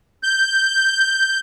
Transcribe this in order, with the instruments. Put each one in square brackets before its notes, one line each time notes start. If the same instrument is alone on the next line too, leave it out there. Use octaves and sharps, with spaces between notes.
[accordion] G6